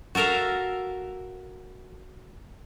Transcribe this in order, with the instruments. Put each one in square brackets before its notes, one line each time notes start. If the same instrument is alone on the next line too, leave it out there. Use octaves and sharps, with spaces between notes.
[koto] F#4 A4 A#4 E5 F5